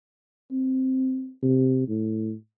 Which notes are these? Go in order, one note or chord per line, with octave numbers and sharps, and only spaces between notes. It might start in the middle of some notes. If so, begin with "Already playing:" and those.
C4
C3
A2